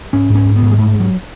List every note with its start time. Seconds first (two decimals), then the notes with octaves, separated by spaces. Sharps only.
0.13 G#2 C#4
0.30 G#2
0.35 C#4
0.45 G#2
0.56 B3
0.62 G#2
0.71 G#3
0.78 G#2 A3
0.95 G#2
1.00 F#3